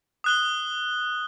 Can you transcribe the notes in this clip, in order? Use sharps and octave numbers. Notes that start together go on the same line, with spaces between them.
D#6 F#6 G7